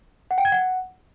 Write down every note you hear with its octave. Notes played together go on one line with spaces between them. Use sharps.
F#5
G5
G#6
F#5